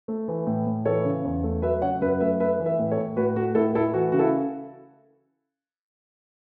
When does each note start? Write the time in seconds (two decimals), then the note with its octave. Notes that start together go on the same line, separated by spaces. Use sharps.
0.08 A3
0.28 E3
0.47 A2
0.66 A2
0.85 E3 A4 C#5
1.05 C#3
1.25 E2
1.44 A3
1.62 F#3 B4 E5
1.82 C#3 C#5 F#5
2.01 F#2 B4 E5
2.20 A3 B4 E5
2.40 A3 B4 E5
2.60 E3
2.66 B4 E5
2.79 A2
2.91 A4 C#5
2.98 A2
3.17 A2 F#4 B4
3.36 A3 F#4
3.55 A2 E4 A4
3.74 A3 E4 A4
3.94 E3 F#4
4.12 C#3 F#4
4.19 E4 A4